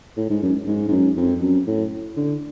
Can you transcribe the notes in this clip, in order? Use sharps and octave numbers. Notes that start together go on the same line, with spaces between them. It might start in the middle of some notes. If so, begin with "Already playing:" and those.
A2
G#2
F#2
G#2
G#2
F#2
F2
F#2
A2
D3